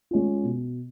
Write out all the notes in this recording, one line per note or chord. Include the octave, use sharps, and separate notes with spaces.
G#3 C#4 F4
B2